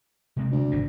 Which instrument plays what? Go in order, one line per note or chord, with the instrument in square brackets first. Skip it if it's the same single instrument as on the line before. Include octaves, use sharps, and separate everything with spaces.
[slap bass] C3 G#3 C4
[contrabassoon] D2
[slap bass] G#1 B2 D3